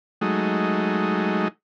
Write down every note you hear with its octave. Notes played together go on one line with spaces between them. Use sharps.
F#3 G#3 A3 D#4